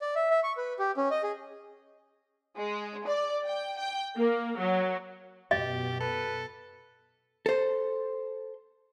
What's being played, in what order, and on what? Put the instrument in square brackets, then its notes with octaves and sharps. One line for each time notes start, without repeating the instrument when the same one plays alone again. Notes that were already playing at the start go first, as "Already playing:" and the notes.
[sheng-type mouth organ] D5
E5
E5
C#6
B4
G4
C#4
D#5
G#4
[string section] G#3
D5
G5
G5
A#3
F#3
[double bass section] F#2 B2 [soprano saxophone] G4 [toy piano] D#5
[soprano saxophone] A4 [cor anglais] B4
[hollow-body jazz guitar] A4 C5